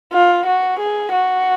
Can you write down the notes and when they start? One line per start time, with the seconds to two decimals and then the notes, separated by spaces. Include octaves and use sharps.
0.13 F4
0.46 F#4
0.79 G#4
1.12 F#4